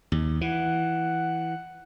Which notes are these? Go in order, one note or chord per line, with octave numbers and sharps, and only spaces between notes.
D#2
E3 F#5